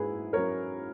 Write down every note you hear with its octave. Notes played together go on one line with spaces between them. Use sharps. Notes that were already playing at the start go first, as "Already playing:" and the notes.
Already playing: G#2 F#3 C#4 E4 G#4 B4
F#3 C#4 A#4 C#5